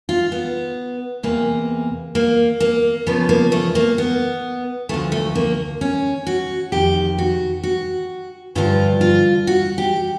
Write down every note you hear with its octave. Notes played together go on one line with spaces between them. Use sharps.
F4
B3
E2 C3 E3 A#3
A#3
A#3
E2 C#3 F3 B3
A#3
A3
A#3
B3
D2 D3 F3 A3
A3
A#3
C#4
F#4
F2 C3 D#3 G4
F#4
F#4
G2 D3 F3 F4
F4
F#4
G4